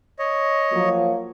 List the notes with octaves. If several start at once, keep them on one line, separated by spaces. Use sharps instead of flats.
C#5 D#5
F3 F#3 A#3